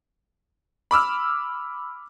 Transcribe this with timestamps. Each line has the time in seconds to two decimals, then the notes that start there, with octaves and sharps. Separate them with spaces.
0.91 B5 D6 E6 F6